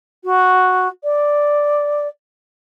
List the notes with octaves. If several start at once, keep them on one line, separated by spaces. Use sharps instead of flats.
F#4
D5